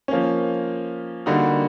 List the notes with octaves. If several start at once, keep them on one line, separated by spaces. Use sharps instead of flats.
F3 A#3 C#4
D3 G3 A#3 D#4 F#4